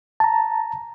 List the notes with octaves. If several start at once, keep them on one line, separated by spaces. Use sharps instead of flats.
A5 A#5